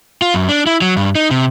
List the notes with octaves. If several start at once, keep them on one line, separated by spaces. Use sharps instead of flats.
F4
F#2
D4
E4
F#3
G2
D#4
C3